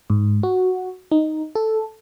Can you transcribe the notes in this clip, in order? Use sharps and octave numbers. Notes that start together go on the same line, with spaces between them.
G#2
F#4
D#4
A4